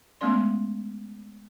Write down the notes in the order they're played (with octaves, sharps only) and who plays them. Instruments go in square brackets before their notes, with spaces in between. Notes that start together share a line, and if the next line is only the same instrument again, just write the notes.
[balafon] G#3 A3 B3 C#4 D5 C6